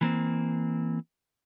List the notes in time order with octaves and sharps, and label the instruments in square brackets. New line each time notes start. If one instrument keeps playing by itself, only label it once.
[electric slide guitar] E3 A#3 C4